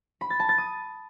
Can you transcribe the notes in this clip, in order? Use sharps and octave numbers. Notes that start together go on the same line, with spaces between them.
B5
A6
A5
A6
D#6